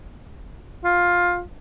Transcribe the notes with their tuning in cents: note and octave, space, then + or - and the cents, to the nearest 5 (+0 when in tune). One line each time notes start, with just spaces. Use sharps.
F4 +15